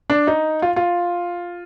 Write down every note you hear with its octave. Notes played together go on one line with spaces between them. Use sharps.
D4
D#4
F4
F4